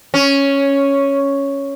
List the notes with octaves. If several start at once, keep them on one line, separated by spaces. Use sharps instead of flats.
C#4